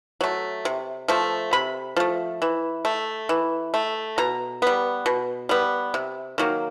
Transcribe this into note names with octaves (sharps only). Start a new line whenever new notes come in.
F#3 A3
C3
F3 A3
C3 B5
F3 A3
E3
A3
E3
A3
B2 A#5
G3 B3
B2
G3 B3
C3
D#3 F#3 A#3